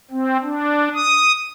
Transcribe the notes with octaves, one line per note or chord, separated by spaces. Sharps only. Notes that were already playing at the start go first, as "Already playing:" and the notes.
C4
D4
D#6